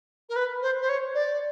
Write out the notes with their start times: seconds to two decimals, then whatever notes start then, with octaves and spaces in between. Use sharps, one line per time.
0.29 A#4
0.36 B4
0.62 C5
0.81 C5
0.89 C#5
1.15 D5